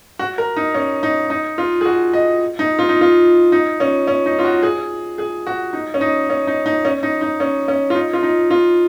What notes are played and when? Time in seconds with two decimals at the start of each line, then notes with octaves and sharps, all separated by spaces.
0.19 F#4
0.38 A#4
0.56 D#4
0.75 C#4
1.03 D#4
1.30 D#4
1.58 F4
1.81 G#4
1.85 F#4
2.13 D#5
2.59 D#4
2.79 F4
2.89 D#4
3.01 F4
3.52 D#4
3.80 C#4
4.08 C#4
4.26 D#4
4.39 F4
4.45 F#4
4.63 G#4
5.18 G#4
5.47 F#4
5.73 D#4
5.94 C#4
6.01 D#4
6.30 C#4
6.47 D#4
6.66 D#4
6.85 C#4
7.03 D#4
7.21 D#4
7.40 C#4
7.68 C#4
7.90 F4
7.95 D#4
8.13 F4
8.23 D#4
8.51 F4